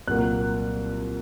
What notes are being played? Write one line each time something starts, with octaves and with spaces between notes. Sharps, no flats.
C2 A#2 F#3 A#3 F#6